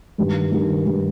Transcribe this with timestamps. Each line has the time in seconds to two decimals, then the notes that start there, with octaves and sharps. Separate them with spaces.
0.18 G2 D#3 G3
0.52 G2 D#3 G3
0.86 G2 D#3 G3